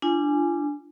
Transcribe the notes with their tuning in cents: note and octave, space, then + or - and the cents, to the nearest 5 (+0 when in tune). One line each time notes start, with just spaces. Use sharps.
D4 +0 F4 -35 G#5 +0